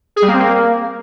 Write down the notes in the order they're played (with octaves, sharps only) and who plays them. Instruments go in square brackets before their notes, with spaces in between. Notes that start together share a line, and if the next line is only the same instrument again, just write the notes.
[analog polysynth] G#4
G3
A#3
C4
A#3